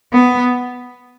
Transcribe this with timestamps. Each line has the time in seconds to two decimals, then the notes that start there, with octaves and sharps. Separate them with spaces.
0.13 B3